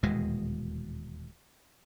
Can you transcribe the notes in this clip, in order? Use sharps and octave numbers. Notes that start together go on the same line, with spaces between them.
D#1 E2 B2 G#3